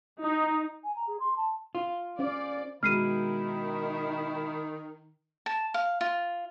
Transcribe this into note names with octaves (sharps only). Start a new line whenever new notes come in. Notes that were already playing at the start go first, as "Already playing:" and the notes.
D#4
G#5
A#5
G#4
C6
A5
F4
C#4 C5 D5 F5
B2 D#3 G#3 E4 F6 C7 D#7
A5
F5
F4